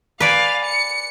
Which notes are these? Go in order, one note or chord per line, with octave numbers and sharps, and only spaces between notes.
B4 D5 F5 G#5
C#7